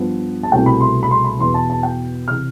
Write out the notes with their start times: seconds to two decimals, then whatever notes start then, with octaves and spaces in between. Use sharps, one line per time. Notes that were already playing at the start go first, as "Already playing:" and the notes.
Already playing: G2 F3 B3
0.43 A5
0.52 C2 B2 A3 G5
0.66 B5
0.81 C6
1.03 B5
1.11 C6
1.25 B5
1.39 E2 B2 B3 C6
1.54 A5
1.70 A5
1.83 G5
2.28 C3 E3 F6